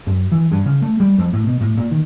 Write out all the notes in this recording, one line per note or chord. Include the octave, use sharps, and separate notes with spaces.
F#2
E3
G2
C#3
A3
G3
F2
A2
B2
A2
A#2
D#3